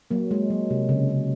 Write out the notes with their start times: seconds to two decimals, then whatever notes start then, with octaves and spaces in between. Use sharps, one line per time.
0.11 F#3 A#3
0.31 G#3
0.50 F#3
0.70 C3
0.89 C#3
1.09 C#3